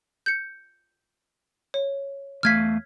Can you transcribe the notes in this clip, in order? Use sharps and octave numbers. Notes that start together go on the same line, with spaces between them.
G6 C#7
C#5
E2 A3 F5 F6 G#6 B6